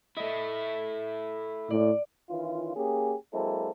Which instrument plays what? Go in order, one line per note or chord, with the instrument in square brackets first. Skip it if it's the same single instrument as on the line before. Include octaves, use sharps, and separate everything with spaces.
[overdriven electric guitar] A3 E4 [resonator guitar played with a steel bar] D#5
[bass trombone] A2 [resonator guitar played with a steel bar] D5
[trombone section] D#3 E3 C#4 F4
A#3 C#4 G4 G#4
F#3 G#3 A#3 C4 E4 A4